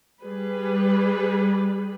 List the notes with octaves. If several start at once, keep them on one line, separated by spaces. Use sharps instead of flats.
G3 G#4 B4